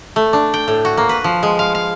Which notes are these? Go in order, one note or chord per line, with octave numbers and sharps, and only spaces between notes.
A3
D4
G5
A2
F#4
A#3
B4
F3
G#3
F5
F5